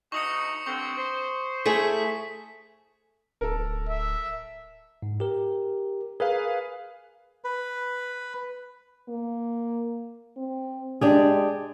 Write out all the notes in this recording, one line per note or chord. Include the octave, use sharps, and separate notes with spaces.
D2 D#4 C#6 D#6 C#7
G2 D3 C4 C#6
C5
A3 E4 G#4 B6
D1 A4 A#4
E5
G#2
G4 A#4
G#4 A#4 B4 F5
B4
A#3
C4
G#3 D4 G4 G#4